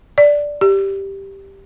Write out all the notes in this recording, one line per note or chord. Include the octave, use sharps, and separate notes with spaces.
D5
G4